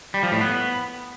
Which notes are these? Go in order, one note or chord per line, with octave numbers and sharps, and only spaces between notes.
G3
F3
A2
B3